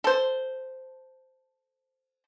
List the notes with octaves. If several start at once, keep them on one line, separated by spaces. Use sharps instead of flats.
A4 C5